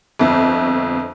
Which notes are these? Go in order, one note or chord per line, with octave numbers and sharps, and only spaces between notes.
G1 F2